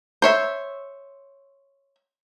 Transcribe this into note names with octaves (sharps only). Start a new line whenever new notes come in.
C5 C#5 E5